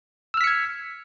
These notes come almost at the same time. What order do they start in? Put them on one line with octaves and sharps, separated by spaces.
E6 F6 B6 C#7 G#6